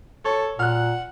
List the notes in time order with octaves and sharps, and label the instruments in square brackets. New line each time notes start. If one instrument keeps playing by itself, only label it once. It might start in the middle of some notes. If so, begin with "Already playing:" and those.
[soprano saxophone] A4 [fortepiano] C#5
[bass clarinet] A#2 [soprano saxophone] F#5 [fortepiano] F6 F#6